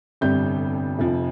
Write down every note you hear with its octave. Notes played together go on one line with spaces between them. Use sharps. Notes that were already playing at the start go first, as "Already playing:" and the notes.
G1 F2 C3 G3 G6
F1 F2 C3 F3